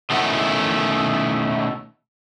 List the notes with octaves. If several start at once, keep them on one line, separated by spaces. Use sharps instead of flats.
B2 D#3 A3 C#4 E4 F#5